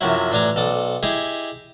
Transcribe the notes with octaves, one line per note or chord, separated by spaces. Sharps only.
F#2 C3 F3 F#3 E4
A1 D4 D5 G#5 A#5
B1 A4 D5 D#6
E4 G4 G#4 D#5